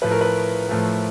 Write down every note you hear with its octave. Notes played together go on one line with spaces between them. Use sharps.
A2 F3 A3 B4
A#4
B4
A2 F3 A3